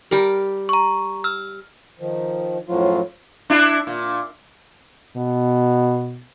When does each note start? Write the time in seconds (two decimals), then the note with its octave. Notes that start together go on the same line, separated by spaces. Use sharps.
0.11 G3 G4 A#4
0.69 A#5 C#6
1.24 E6 F6
1.99 D#3 F3
2.68 F#2 A2 F3 F#3 F4
3.50 D4 E4
3.87 A#2
5.17 B2